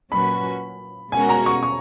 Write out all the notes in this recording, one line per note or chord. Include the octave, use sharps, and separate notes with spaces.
A#2 F#3 C#4 F#4 B4 B5
B2 G#3 C#4 F#4 A#4 G#5
A#5
C#6
C#6